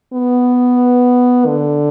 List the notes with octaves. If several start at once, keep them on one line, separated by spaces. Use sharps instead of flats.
B3
D3